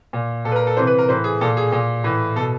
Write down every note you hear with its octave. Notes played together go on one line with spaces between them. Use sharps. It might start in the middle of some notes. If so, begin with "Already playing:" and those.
A#2
A#2 A4
B4
A#4
A4
C3 E3 C5
B4
A#4
A2 E3 C5
G#4
A#2 A4
G#4
A#2
A2 E3
B2 A4